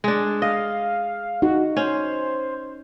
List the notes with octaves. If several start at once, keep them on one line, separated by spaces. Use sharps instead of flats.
G#3 D4
D#5 F5
D#4 F#4
C#4 C5